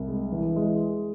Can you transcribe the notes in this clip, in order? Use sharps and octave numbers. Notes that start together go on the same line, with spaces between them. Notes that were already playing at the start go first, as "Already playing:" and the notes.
Already playing: C2
G#3
E3
G#3